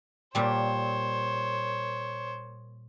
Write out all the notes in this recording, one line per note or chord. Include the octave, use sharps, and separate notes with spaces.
A#2 G3 C5 C#5